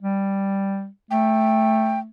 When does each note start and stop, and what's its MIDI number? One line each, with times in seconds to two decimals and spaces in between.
0.02 0.88 55
1.11 2.09 57
1.11 1.99 79